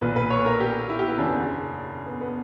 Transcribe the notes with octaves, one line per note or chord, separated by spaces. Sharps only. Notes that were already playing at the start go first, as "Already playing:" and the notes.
B1 A#2 B4
B4
C#5
A#4
G4
E4
G4
B4
F#1 E2 C#3 D4
B3
B3